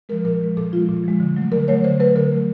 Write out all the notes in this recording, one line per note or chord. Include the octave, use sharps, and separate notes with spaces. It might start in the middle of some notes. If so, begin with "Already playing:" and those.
F3 G#3 A#4
A#2 A#4
F3 G#3
A#2 A4
F3 G#3 F4
A#2
F3 G#3
D3
F#3 A3
D3 A#4
F#3 A3 C#5
D3 C5
F#3 A3 B4
D3 A#4
F#3 A3